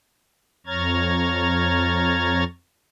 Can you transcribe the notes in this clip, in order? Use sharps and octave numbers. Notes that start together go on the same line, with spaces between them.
F2 C#5 A#5 F6 G#6 A6